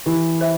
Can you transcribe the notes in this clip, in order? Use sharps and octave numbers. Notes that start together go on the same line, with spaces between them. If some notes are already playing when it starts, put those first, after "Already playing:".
E3 G4
C5 E5